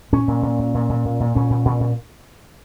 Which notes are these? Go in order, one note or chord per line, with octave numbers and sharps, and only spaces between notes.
A#2 C#4
A#2
A#2
A#2
A#2
A#2
A#2
A#2
A#2 C#4
A#2
A#2
A#2